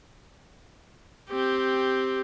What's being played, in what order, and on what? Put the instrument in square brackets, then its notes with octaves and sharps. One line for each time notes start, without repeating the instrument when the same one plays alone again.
[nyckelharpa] C4 G4